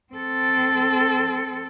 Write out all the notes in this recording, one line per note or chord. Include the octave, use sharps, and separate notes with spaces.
C4 A4